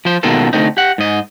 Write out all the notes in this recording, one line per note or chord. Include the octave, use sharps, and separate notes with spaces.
F3 C5
B2 D#3 G#3 A#3 F4 A4
D3 A3 C4 D#4
G4 F#5
G#2 D#5